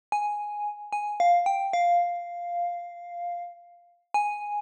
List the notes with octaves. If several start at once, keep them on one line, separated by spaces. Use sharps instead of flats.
G#5
G#5
F5
G5
F5
G#5